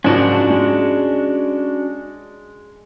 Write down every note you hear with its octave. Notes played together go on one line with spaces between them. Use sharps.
F#1 G#2 F3 C#4 D4 F#4
G#3